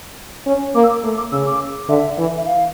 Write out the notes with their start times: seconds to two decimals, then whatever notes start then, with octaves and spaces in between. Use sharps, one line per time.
0.46 C#4
0.75 A#3 D6
0.84 E6
0.89 D6
1.04 A3
1.18 D6
1.32 C#3 E6
1.46 D6
1.89 D3 E5
2.18 E3
2.37 E5
2.46 F5